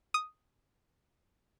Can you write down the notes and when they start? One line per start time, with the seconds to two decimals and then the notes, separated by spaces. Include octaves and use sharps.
0.14 D#6